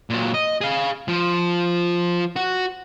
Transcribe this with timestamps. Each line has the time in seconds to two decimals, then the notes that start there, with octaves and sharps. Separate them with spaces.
0.10 A#2 F#3
0.34 D#5
0.61 G#4 F5
1.08 F3
2.36 F#4